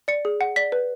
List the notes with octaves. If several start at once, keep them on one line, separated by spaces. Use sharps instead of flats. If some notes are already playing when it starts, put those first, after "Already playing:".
D5 C#7
G#4
F#5
D5 B6
B4